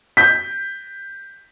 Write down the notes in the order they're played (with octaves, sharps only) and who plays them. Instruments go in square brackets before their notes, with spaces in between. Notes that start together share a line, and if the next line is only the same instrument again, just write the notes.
[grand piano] G6 B6